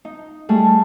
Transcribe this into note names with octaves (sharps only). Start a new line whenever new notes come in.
D#4
G3 A3 G#4